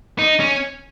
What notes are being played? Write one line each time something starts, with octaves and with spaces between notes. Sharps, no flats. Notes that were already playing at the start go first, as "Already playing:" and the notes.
D#4
C#4